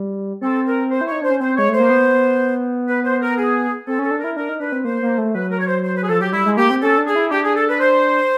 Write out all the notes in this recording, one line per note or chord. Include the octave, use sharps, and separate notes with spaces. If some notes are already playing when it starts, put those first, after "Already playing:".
Already playing: G3
C4 A4
A#4
C5
E4
D#4 C#5
D4 C5
C#4
C4 C5
G#3 C#5
A3
C5
A#3
B3
B4
C5
A#4
G#4
C4 A4
C#4 A4
D4
A#4
E4
D4 A#4
D#4
D4 B4
C4
A#3 C5
A#3
A3
F#3 B4
A#4
C#5
C5
C5
B4
G#4
F3 A4
F#3 G4
G3 E4
G#3
A#3 G4
C4
C#4 A4
D4
G#4
E4
D4 G4
G#4
A4
B4
C5